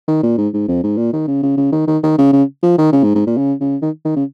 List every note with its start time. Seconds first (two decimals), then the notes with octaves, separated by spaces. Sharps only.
0.08 D#3
0.23 A#2
0.38 G#2
0.53 G#2
0.68 F2
0.83 G#2
0.97 A#2
1.13 D#3
1.27 C#3
1.43 C#3
1.57 C#3
1.72 D#3
1.87 D#3
2.03 D#3
2.18 C#3
2.33 C#3
2.63 F3
2.78 D#3
2.92 C#3
3.04 G#2
3.15 G#2
3.27 A#2
3.37 C#3
3.61 C#3
3.82 D#3
4.05 D#3
4.16 C#3